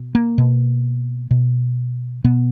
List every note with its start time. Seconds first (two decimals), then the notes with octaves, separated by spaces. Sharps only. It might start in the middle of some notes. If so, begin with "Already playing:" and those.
Already playing: B2
0.15 A#3
0.38 B2
1.31 B2
2.24 B2 B3